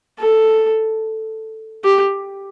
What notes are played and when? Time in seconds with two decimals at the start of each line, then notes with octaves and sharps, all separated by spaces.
0.19 A4
1.84 G4